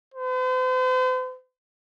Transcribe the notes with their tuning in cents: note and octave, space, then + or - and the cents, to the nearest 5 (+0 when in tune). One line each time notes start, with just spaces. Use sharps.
C5 -45